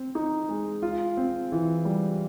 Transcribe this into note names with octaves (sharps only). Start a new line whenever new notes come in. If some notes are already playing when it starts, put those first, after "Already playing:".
Already playing: C4
D#4
G#3
F4
C4
E3
G3